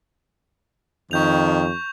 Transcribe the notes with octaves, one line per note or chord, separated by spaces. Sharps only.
F2 D#3 C#6 G6 F7